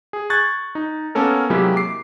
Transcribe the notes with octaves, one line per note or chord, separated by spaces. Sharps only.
G#4
C#6 F#6 G#6 A6
D#4
A#3 B3 C#4 A4 A#4
C3 F#3 G#3 A#3 E4 G4
D6 C7